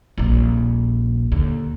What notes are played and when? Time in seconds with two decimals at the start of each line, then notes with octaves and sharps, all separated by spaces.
0.18 D#1 A#1
1.32 D#2 D3